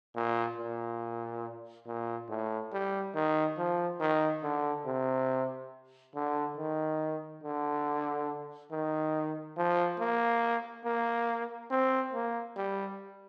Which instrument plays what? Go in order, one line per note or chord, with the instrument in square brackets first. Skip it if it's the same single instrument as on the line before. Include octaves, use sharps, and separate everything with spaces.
[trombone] A#2
A#2
A#2
A2
G3
D#3
F3
D#3
D3
C3
D3
D#3
D3
D#3
F3
A#3
A#3
C4
A#3
G3